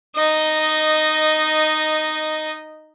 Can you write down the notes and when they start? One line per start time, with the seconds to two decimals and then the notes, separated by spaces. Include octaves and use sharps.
0.16 D#4 D#5